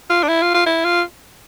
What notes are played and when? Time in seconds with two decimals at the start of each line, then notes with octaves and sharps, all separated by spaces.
0.10 F4
0.23 D4
0.29 E4
0.42 F4
0.54 F4
0.66 E4
0.85 F4